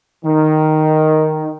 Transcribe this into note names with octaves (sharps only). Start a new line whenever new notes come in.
D#3